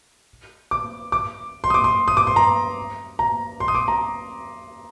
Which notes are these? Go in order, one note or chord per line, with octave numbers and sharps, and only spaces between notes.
D6
D6
C6
D#6
D6
C6
D#6
D6
C6
A#5
A#5
C6
D#6
D6
A#5